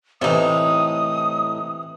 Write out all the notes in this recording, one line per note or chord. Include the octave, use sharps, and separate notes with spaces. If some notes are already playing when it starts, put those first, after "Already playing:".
A2 C3 E3 D#4 D#6